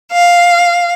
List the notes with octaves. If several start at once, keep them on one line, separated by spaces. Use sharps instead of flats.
F5